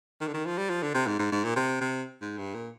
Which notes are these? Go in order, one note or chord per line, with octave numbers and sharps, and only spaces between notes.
D#3
D3
D#3
F3
G3
F3
D3
C3
G#2
G#2
G#2
A#2
C3
C3
G#2
G2
A#2